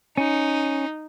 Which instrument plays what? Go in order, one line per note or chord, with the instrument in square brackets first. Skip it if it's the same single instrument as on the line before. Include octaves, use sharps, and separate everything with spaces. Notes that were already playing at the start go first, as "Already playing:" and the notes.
[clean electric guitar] C#4 [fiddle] D#4